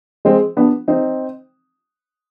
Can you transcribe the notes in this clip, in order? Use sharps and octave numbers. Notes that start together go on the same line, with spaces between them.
G#3 C4
B3 D4
C4 D#4